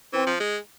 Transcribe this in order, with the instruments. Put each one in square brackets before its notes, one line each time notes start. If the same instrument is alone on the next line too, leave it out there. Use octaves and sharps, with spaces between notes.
[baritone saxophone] E3 [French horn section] C4
[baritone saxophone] F3
G#3